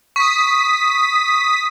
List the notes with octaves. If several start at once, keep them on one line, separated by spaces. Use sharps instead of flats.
C#6 D#6 B6